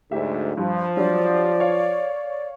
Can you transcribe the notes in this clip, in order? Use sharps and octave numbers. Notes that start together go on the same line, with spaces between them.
D2 G#2 G4 E5
G2 F3 G3
F#3 G3 D4 D5
C#5 F5